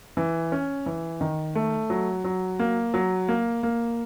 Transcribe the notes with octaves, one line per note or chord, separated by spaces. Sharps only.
E3
C#4
E3
D#3
A3
F#3
F#3
A#3
F#3
A#3
A#3